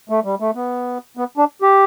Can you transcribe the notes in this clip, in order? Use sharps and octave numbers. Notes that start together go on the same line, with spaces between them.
A3
G3
A3
B3
B3
D4
G4